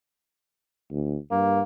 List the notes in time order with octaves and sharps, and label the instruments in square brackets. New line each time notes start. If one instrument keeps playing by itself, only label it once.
[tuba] D2
[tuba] G2 [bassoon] A#3